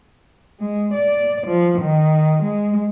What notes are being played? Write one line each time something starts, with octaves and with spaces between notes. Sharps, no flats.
G#3
D5
F3
D#3
G#3